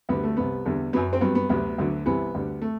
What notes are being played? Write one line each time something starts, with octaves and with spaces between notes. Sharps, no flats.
D2 D3 G3 B3
A3
C2 C3 G3 B3
E2 D3 G3
F#2 F#3 B3
C4
G2 F#3 B3
B3
D2 C3 F#3 B3
D2 D3 F#3
C2 C3 E3 B3
D2 D3 G3
A3